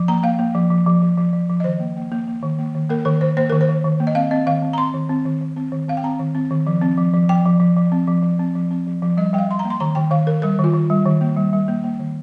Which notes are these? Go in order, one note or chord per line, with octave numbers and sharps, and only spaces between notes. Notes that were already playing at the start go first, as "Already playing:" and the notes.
Already playing: F3
A#3 A#5
A#3 F5
A#3
F3
F3
F3
F3
F3
F3
F3
D#5
D#3 C5
A#3
A#3
A#3
A#3
D#3
A#3
D#3
A#3 A#4
D#3 A#4
D#3 C5
A#3 C5
D#3 A#4
C5
D#3
D#3
A#3
D#5
C4 F5
C4 D#5
D#3 F5
C4
A#5
C4 C6
D#3
C4
D#3
D#3
C4
D#3
C4 F5
G5
C4 A#5
D#3
C4
D#3
F3
C4
F3
F3
F3 G5
F3
F3
F3
C4
F3
F3
C4
F3
C4
F3
F3
G3 D#5
G3 G5
F5
G3 C6
A#5
A#3
C6
D#3 A#5
D#3 G5
D#3 F5
D#3 A#4
G3 A#4
D#3 F4
D#3
G3
D#3
A#3
G3
G3
A#3
A#3
D#3